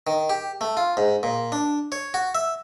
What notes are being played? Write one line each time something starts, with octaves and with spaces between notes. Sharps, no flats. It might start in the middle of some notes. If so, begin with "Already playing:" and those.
D#3
G4
A3
F4
G#2
A#2
D4
C#5
F#4
E5